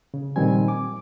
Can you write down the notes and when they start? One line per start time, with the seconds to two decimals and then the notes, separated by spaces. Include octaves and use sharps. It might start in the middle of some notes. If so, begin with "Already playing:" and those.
0.14 C#3
0.36 A#2 D#3 F3 G3 C4 G#5
0.68 D6